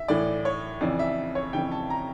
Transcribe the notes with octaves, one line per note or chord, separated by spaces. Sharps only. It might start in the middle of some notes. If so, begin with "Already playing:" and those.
Already playing: E5
A2 E3 D5
C#5
F2 C#3 E3 D5
E5
C#5
F2 C#3 E3 G5
A5
A#5